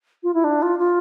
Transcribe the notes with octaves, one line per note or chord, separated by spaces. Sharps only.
F4
E4
D4
F4
F4